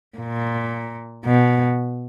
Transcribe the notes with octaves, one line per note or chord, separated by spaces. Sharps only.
A#2
B2